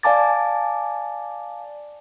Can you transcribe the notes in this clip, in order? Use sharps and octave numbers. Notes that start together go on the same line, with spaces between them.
D5 F5 G#5 A5 D6 A6